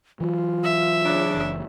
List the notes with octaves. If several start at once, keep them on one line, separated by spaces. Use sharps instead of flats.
E3 F#3 F4
E5
C#3 D4
F#1 E3